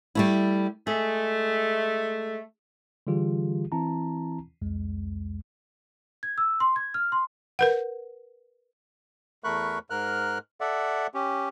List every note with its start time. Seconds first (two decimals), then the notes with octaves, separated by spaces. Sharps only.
0.15 G3 A3 E4
0.87 G#3 A3 G#4
3.07 D3 E3 G3 F4 G4 G#4
3.72 E3 C4 E4 A5 A#5
4.62 C2 F2 G#3
6.23 G#6
6.38 E6
6.60 C6
6.76 G#6
6.94 F6
7.12 C6
7.59 A#4 B4 F#5
9.44 E2 A3 A#4 B5 C#6 F#6
9.90 G#2 A#4 F6 F#6
10.61 A4 D5 E5 F#5
11.14 C#4 G4